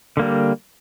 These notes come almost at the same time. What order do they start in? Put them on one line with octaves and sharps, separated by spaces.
D3 A#3 G3